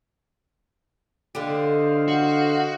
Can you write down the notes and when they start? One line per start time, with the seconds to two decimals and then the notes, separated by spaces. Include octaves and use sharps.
1.35 D3 G4 C5 D#5 F5
2.08 F#4